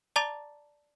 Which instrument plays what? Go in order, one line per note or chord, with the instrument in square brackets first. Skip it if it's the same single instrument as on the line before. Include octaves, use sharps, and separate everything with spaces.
[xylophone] D5 A5 A#5 D6 A6 F7